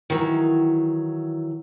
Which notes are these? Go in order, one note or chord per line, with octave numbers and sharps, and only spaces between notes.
D#3 E3 F#3